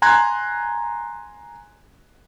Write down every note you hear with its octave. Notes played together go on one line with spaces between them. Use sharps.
G#5 A#5 C6 F#6 G#6